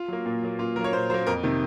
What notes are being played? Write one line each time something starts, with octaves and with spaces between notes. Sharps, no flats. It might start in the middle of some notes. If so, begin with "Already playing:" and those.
Already playing: F4
F#3 A#3
A#2
F#3 A#3
A#2 F4
F#3 A#4
A#3 C#5
A#2 C5
F#3 A#3 C5
F2 A#4
C3 D#3